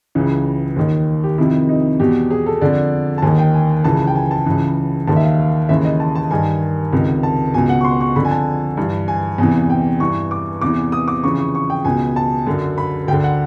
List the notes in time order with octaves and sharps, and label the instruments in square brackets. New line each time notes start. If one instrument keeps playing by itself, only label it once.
[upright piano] C#2 C#3 E3
D#2 D#3
G4
F2 C3 D#3 E4
D#4
E2 B2 G4
G#4
A4
F2 D3 D5
A5
D#2 D#3 G#5
G5
G#5
C#2 C#3 E3 A5
G5
G#5
A5
C#2 C#3 E3
D#2 D#3 A5
E5
F5
F5
D#2 C#3 E3 E5
D#5
A5
A5
G2 D#3 G#5
C#2 C3 D#3
A5
B2 G#5
C#2
F#5
C#6
C6
C#6
D3 B5
F2
G#5
A5
G2 E3
G#5
E2 C3 E3 G#5
G5
G2 E3 C#6
D6
E2 C3 E3 D6
D#6
D6
F2 C#3 E3 C#6
C#6
C#6
G5
C#2 B2 G#5
A5
F#2 D3
B5
D2 G5
D3
F#5